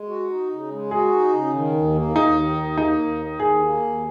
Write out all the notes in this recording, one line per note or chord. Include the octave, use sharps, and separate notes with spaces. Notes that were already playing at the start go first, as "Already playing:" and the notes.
Already playing: G#3
F#4
D#4
C#3
G#3
F#4 G#4
D#4
C#3
D#3
D#2
A#3
D#2 D#4
D#3
D#2
A#3 D#4
D#2
D#3
D#2 G#4
A#3
D#2